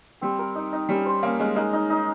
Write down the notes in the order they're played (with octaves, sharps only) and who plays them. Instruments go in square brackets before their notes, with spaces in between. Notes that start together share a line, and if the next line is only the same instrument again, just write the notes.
[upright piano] G3 [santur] C4
[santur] A#4
D#4
D#4
[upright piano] G3 [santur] C#4
[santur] C5
[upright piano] A#3 [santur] C#4
[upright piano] G#3 [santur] C#4
[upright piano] G#3 [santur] D#4
[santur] D#4
D#4